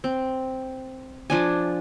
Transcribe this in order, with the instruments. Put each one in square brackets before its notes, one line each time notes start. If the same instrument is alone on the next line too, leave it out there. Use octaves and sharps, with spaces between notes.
[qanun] C4
F3 D4 G#5